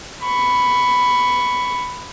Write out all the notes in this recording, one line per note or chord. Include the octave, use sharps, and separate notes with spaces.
B5 C#6